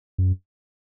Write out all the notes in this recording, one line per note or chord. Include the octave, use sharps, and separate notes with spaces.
F#2